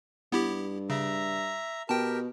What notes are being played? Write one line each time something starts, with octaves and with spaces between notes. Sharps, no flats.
G2 B3 E4 G4
C#3 E5 A#5
B2 G4 A#4 G5 A5